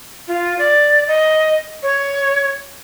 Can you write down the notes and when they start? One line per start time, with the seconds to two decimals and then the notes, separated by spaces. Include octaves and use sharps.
0.28 F4
0.59 D5
1.08 D#5
1.83 C#5